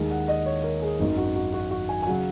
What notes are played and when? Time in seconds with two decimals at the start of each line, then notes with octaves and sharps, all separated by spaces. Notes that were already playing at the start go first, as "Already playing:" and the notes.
Already playing: D#2 D#3 G#3
0.10 F#5
0.28 D#5
0.46 C#5
0.64 A#4
0.82 G#4
1.00 G#1 F#2 D#3 F#3 D#4
1.17 F#4
1.36 F#4
1.54 F#4
1.71 F#4
1.89 G#5
2.02 G#5
2.07 C#3 F#3 F#5